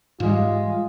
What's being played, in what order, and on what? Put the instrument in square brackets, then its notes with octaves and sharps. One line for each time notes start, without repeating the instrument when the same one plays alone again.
[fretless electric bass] G#2 E3 G3 [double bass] G#3 [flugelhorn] F4